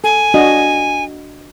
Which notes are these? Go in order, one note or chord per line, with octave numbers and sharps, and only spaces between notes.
A4 G#5
D4 F#4 D#5